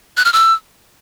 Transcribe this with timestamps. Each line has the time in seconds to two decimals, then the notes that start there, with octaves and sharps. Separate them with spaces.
0.17 F#6
0.25 F6
0.33 E6